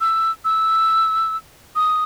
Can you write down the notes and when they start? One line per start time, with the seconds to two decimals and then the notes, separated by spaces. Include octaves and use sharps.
0.01 E6
0.45 E6
1.76 D#6